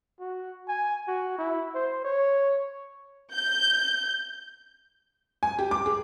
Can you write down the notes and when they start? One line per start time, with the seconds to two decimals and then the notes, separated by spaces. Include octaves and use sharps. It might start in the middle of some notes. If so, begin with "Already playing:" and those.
0.20 F#4
0.68 G#5
1.08 F#4
1.39 E4
1.75 C5
2.04 C#5
3.34 G6
5.43 G#5
5.59 G4
5.71 D6
5.86 G#4